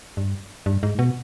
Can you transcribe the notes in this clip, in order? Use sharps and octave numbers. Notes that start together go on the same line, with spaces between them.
G2
G2
G#2
B2